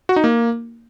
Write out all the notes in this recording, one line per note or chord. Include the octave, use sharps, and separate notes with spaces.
F#4
D#4
A#3